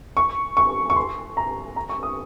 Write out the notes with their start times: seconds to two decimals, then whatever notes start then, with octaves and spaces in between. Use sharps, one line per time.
0.17 C#6
0.57 C#6
0.90 C#6
0.96 C6
1.37 A#5
1.76 A#5
1.89 C#6
2.03 D#6